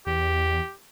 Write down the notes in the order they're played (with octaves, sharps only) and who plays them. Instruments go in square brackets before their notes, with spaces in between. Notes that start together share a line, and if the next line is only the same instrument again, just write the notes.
[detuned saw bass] E2 [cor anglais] G4